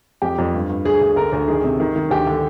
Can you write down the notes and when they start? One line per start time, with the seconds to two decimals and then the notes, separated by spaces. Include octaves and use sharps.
0.22 F2 G4
0.38 F2
0.54 G2
0.69 G2
0.85 D2 G#4
1.01 D2
1.16 D3 A#4
1.33 D2
1.48 D#3 G#4
1.64 C3
1.80 D#3
1.96 D#3
2.10 D2 G4
2.27 D3